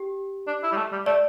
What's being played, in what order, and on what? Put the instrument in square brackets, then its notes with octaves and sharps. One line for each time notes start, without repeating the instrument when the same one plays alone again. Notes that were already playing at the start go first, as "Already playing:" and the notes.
Already playing: [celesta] G4
[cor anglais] D4
E4
G3
A3
G3
[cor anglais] A3 [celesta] D5